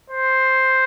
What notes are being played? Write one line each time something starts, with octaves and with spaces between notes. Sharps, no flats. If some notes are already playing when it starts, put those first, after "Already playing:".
C5